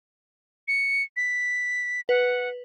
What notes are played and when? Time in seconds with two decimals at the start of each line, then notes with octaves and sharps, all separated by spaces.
0.68 C#7
1.16 B6
2.09 B4 F#5